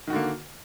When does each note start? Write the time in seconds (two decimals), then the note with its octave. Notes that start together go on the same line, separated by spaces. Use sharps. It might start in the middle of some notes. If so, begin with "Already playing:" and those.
0.08 D#3
0.10 F#4
0.13 D3
0.16 A#3